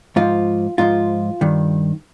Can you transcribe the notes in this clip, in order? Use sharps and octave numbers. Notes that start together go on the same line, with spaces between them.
G#2 F3 F4
G#2 F3 F4
G2 D#3